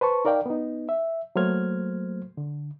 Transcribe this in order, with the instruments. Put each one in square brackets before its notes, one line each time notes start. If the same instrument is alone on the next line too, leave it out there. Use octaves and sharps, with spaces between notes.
[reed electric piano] B4 C5 A5 C#6
D#4 A#4 D5 F5 G5
B3 D#4
E5
F#3 A3 A#3 C5 F6 G#6
D3